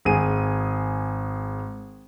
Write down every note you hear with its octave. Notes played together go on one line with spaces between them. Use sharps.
G#1 G#4 D#7